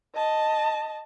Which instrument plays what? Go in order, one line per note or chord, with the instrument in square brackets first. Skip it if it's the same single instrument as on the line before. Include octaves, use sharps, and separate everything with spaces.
[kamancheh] D#5 A5